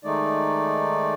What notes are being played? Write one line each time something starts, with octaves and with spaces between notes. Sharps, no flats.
D#3 G#3 A3 D#4 D5